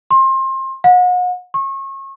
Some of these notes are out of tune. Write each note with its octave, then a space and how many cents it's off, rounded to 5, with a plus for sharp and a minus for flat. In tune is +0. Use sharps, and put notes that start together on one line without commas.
C6 +30
F#5 -40
C#6 -35